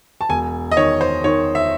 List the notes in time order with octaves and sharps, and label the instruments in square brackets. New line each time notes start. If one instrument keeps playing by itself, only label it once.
[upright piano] A5
E1 G#5
D#5
D#3 C#5
C5
D#3 C#5
E5